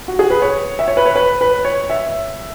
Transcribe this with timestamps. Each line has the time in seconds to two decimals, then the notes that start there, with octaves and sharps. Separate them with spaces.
0.08 F#4
0.19 G#4
0.30 B4
0.42 C#5
0.79 E5
0.88 C#5
0.97 B4
1.06 C#5
1.15 B4
1.41 B4
1.65 C#5
1.90 E5